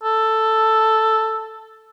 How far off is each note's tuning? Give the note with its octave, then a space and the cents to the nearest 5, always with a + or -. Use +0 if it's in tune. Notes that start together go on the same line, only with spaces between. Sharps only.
A4 +5